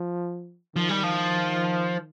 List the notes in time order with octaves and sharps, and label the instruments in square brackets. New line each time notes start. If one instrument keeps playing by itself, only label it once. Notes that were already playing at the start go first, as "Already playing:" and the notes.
Already playing: [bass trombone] F3
[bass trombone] D#3 [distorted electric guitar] F3
[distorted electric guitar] G3
F3